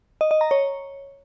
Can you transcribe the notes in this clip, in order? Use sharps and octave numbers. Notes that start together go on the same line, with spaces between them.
D#5
D#5
A#5
C#5